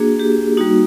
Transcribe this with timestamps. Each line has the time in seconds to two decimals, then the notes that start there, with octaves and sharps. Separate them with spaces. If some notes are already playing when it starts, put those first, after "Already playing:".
Already playing: A#3 D4 F#4 G#4
0.19 G4
0.57 G3 A#3 D#4 F#4